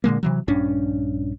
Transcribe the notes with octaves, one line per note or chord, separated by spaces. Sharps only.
A#2 D3 G#3 A#3
C3 E3 F#3
A#1 G2 C#4 D4